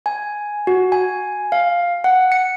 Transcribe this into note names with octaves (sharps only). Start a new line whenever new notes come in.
G#5
F#4
G#5
F5
F#5
C#7